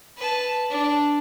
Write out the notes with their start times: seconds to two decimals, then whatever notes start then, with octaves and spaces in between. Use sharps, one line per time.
0.17 B4 A5
0.70 D4